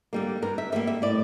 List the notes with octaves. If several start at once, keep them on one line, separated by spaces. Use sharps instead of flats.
D3 G3 A#3
G2 A#4
E5
D3 G3 A#3 E5
E5
A2 D5